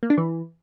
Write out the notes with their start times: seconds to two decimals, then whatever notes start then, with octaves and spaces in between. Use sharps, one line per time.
0.03 A#3
0.10 D4
0.18 E3